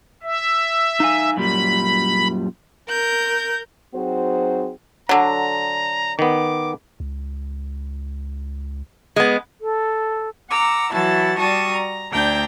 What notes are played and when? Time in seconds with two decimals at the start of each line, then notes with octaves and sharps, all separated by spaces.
0.23 E5
1.00 D#4 F5 G#5
1.37 F#2 A#2 G3 B5
2.88 A#4 G6
3.95 F#3 C4 D#4 F#4 G#4 C5
5.09 D3 F#3 A#5
6.19 D#3 B3 D6
7.00 C#2
9.16 G#3 B3
9.61 A4
10.50 F#5 A#5 D6 E6
10.92 E3 F#3 E4 F#4 A5 A6
11.39 G3 F#4 D5 A5 C#6 D#6
11.73 A#5
12.12 D2 D4 G5 A#5 G6